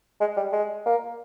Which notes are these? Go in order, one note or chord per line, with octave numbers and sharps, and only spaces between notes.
G#3
G3
G#3
A#3